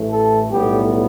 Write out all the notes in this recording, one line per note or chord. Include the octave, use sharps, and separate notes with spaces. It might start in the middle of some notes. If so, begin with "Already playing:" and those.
Already playing: A1 A2 E3 A3
A4
B1 A2 G3 B3 G4